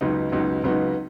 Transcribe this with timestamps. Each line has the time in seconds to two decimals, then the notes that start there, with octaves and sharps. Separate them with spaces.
0.01 C#2 C#3 F#3 B3 D#4
0.32 C#2 C#3 F#3 B3 D#4
0.63 C#2 C#3 F#3 B3 D#4